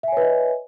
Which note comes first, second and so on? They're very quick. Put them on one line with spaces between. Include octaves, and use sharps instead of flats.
E5 G#5 C#5 B4 D#5